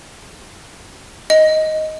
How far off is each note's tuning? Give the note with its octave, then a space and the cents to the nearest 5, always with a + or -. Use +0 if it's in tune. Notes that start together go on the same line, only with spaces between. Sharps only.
D#5 +5